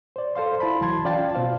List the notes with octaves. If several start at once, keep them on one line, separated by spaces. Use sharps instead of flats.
C5 D5
A4 C5 F5 C6
E4 A5 B5 C6
C2 E3 F#3 A5 C6 G#6
C#4 F4 D5 F5 G5 A5
B2 F4 C5 F5